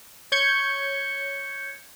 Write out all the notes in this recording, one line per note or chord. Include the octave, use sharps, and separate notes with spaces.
C#5 G6 G#6 C#7